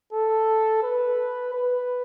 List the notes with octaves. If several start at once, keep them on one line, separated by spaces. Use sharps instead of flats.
A4
B4
B4